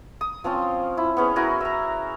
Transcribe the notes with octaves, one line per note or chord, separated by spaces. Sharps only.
D#6
F3 C4 C#4 F4
E4
B3 C#4 G#4
E4 F#4 A#4 G#5
E5 A#5